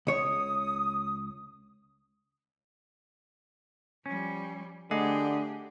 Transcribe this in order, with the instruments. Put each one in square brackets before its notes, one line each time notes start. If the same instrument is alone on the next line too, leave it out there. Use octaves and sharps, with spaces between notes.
[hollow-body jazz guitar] C#2 C#5 [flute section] D#6
[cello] F3 G3 [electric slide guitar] C#4
[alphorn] D3 [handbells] A3 D#5 F#5 [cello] D4 G4 [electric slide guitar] G#4